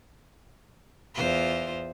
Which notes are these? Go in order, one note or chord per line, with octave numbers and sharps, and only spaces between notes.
E2 F4 C5